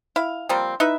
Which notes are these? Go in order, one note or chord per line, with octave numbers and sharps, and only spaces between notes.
E4 F5
F3 G3 A#3 C4
D#4 E4 B4 E5